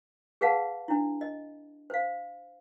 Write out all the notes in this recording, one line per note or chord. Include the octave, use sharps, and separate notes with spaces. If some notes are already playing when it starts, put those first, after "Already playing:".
G#4 B4 F5 F#5 A5
D4 E4
D#5
C5 F5